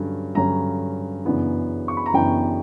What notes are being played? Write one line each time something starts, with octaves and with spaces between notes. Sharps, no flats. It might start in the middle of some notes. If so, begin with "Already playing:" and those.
Already playing: G2 D3 F#3 C#4
G2 D3 F#3 C#4 A#5
F#2 C#3 E3 B3 D4
C#6
B5
A#5
F#2 C#3 E3 B3 D4 G5